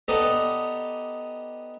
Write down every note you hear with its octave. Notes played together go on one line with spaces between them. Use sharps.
B3 D#4 G4 A4 D5 D#5